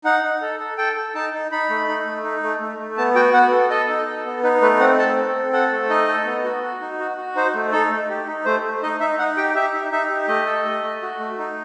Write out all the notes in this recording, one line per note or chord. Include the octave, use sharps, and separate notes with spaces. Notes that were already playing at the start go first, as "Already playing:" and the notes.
D#4 F#5
D#4
A4
A4
A4 G5
A4
D#4 A5
D#4
D#4 B5
A3
D#4
A3
D#4
A3
A3
A3
B3 A5
F#4 G5
B3 F#5
A4
A4 D#5
D#4
A4
B3
D#4 B4
A3 B4
C4 F#5
A4 A5
A4
C4
A4 F#5
A3
D#4 D#5
A4
B3
F#4
F#4
D#4
F#4
F#4
D#4 C5
A3
D#4 A4
A3
G4
D#4
A3 C5
A3
D#4 D#5
D#4 E5
D#4 F#5
G4 G5
G4 E5
D#4
D#4 E5
G4
A3 D#5
A4
A3
A3
F#4
A3
D#4